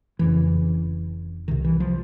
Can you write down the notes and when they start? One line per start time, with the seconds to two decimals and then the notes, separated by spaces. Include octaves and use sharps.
0.19 F1 F2 C#3 E3
1.48 C2 C3 D#3
1.64 E3
1.80 F3